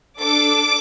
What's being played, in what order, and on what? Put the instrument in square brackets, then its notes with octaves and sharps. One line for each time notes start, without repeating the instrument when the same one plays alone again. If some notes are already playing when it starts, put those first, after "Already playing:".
[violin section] D4 A4 D6